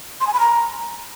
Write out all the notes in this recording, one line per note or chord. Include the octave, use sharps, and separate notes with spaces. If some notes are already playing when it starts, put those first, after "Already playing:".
C6
G#5
B5
A#5